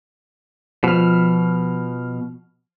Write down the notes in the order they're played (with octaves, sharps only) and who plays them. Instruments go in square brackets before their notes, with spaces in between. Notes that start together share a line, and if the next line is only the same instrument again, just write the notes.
[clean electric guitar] B2 [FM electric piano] F3 F6